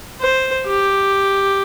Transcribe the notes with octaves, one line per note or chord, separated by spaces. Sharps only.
C5
G4